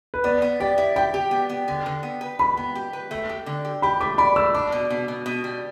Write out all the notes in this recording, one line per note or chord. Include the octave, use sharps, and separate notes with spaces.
B4
B3 D5
B3
G4 D5
E4
G4 G5
G4
B3
B3
D3
D3
B3
B4
B4 B5
B3
G4
B4
A3
G4
D3
G4
G4 B5
A3 D6
D5 B5
A3 E6
D4 D6
B2
B2
B2
B2
G3